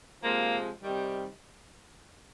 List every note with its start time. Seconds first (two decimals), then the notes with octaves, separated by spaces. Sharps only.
0.23 C3 F3 G#3 A#3
0.81 C3 D#3 G3